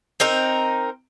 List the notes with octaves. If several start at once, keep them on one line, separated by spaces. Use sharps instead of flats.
C4 D#4 A#4